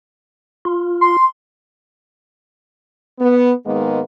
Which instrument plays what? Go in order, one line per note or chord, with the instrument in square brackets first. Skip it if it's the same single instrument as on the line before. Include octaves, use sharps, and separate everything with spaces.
[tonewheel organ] F4
[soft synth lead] C6
[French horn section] B3
G#2 D#3 G#3 A#3 B3